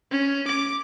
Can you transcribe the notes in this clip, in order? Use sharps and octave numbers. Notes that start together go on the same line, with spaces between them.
C#4
D6